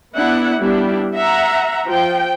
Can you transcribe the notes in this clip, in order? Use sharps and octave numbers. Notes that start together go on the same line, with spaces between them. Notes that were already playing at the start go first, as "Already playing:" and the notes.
B3 D4 E4 F#5
G3 B3 D4 E4 G4
E5 F#5 A#5
F3 G5